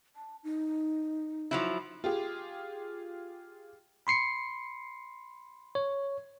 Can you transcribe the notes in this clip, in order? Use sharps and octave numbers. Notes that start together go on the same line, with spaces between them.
A5
D#4
F3 F#3 E4
F4 G4 G#4
B5 C6 C7 C#7
C#5